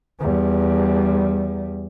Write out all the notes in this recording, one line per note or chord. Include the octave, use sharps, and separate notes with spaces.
E2 G3